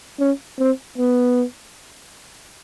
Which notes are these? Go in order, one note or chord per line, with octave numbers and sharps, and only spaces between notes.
C#4
C4
B3